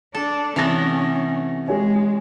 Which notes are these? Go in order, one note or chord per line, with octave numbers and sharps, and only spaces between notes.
D4 A4
C3 E3 A3 B3 C#4 A#6
G#3 G4 C#5 G#5